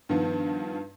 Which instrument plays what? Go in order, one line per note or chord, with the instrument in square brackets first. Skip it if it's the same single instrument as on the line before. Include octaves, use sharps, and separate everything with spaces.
[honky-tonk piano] G2 D#3 F3 B3